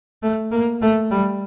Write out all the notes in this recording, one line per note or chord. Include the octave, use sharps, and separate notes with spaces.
A3
A#3
A3
G3